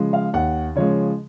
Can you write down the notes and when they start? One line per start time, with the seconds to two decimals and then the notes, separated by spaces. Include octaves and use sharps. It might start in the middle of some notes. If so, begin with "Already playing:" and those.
Already playing: C#3 F3 G#3
0.13 F5
0.33 D#2 F#5
0.75 C#3 F3 G#3 C#5